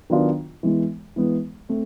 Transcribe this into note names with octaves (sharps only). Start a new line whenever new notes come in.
D#3 F#3 B3 D4 F4
E3 G#3 B3
E3 G#3 B3
A3 C4